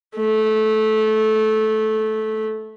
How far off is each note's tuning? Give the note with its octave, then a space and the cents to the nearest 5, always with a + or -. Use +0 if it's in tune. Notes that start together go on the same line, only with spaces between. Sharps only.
A3 -15